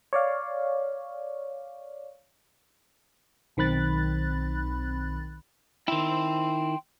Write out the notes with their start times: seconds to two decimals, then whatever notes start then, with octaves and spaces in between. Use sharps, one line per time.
0.13 C#5 D5 F5
3.57 B1 D#3 C4 B5 F#6 A6
5.88 D#3 E4 G5 C6